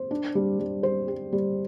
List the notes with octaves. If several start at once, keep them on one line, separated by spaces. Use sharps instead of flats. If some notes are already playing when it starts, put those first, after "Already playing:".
Already playing: C5
D4
G3
G3
C5
G4
G3